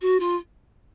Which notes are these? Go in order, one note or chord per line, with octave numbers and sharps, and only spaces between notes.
F#4
F4